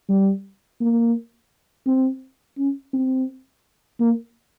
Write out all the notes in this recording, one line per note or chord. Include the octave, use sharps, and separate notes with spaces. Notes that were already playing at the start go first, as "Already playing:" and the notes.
G3
A#3
C4
C#4
C4
A#3